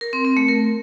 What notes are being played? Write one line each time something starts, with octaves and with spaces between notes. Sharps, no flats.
A#4
C4
C4
A3
A#4